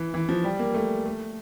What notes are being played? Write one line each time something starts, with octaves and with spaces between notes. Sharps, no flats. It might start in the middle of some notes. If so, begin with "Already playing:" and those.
Already playing: E3
E3
F3
G3
A#3
A3
A3